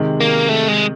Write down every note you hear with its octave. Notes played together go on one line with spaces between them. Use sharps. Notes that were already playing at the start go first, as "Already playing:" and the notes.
Already playing: C3 D#3 G#3
A#3
A3
G#3